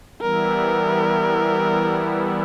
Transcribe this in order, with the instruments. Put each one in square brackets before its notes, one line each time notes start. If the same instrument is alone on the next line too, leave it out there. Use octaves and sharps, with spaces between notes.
[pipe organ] E3 G3 B3 E4 [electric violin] A#4